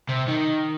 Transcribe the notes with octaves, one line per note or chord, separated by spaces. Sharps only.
C3
D#3